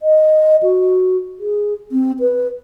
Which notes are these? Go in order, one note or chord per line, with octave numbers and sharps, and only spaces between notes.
D#5
F#4
G#4
C4
B4